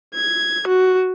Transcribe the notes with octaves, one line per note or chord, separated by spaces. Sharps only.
G#6
F#4